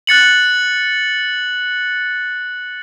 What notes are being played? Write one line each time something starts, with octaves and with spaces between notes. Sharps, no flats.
F#6 A6 C#7 F#7